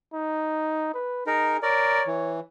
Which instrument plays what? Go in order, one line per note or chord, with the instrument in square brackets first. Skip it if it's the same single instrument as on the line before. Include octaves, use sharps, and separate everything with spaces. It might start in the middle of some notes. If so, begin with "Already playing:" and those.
[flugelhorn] D#4
B4
[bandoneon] D#4 A#4 [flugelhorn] G#4
[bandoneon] A#4 D5 [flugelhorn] C#5
[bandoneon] E3